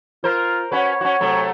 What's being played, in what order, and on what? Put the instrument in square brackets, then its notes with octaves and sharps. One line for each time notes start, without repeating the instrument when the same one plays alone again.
[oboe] F4 [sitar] A#4 C5
[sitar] C#4 F#4 B4 [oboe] C#5
[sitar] C#4 F#4
C3 F#3 A3